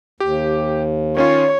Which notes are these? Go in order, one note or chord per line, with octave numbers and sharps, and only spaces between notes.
D#2 G4
D#3 C#4 F4 C#5